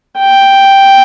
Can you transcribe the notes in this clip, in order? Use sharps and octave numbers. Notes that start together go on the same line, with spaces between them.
G5